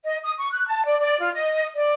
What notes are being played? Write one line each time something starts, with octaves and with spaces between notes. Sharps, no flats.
D#5
D#6
C#6
F#6
A5
D5
D5
F4
D#5
D5